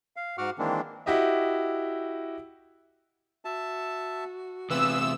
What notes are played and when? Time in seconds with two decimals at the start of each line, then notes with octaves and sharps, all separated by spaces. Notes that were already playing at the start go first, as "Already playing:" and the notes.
0.16 F5
0.38 G#2 F#4 F#5 D6 F6
0.59 D#3 E3 G#3 A#3 C4 D4
1.06 E4 F#4 G4 D#5 E5
3.45 F#4 E5 A5
4.70 E2 C3 F4 G#4 B4 E5 E6